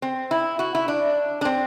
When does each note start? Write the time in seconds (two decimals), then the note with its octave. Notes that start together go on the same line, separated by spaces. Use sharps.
0.02 C4
0.31 E4
0.59 F#4
0.75 E4
0.88 D4
1.41 D4
1.45 C4